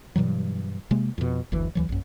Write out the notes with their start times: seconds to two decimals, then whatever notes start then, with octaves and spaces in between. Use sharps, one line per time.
0.16 G2 B2 E3 F#3
0.91 C3 G#3 A#3
1.18 F2 B2
1.52 F#1 D2 E3
1.75 D2 E3 F#3
1.89 A#1 F#2